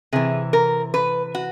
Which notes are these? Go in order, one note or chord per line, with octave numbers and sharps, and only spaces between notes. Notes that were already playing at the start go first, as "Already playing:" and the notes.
C3 E3 G#4
A#4
B4
F#4